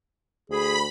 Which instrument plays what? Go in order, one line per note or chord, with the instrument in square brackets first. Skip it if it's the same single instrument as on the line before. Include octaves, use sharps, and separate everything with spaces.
[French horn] D2 [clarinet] G#4 [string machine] B5